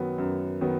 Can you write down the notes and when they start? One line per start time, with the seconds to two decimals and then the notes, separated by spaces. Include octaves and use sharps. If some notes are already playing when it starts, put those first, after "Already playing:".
Already playing: F#2 D#3 F#3 B3
0.18 F#2
0.61 D#3 F#3 B3